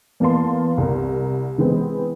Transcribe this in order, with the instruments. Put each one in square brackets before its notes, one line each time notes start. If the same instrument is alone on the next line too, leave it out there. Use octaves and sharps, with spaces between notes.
[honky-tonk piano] E2 A#3 B3 F5 A5 C6
C2 A#4
E3 G#3 B3 C4